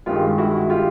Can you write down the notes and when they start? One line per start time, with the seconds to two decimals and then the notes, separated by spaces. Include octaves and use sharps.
0.06 G2 D#3 G#3 F4 G4
0.38 E4 F#4
0.70 F4 G4